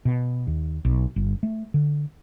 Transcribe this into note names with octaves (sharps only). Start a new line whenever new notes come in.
B2
D#2
B1
G1
A3
D3